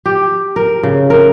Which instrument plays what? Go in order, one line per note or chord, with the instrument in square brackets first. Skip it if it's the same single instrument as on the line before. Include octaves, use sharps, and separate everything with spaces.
[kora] G4
A#4
C#3
A#4